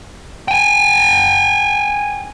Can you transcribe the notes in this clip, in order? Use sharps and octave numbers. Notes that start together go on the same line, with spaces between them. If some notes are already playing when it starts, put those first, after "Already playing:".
G5 G#5